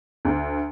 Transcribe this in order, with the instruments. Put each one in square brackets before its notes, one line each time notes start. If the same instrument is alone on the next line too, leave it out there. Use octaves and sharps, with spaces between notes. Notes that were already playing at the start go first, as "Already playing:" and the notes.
[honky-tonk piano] D2